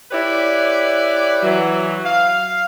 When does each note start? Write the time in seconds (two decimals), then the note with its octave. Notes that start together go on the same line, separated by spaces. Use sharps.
0.12 E4 G4 B4 C#5 D5
1.43 E3 F#3
2.05 F5